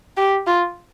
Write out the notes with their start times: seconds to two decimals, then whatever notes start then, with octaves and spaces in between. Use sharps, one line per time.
0.17 G4
0.47 F4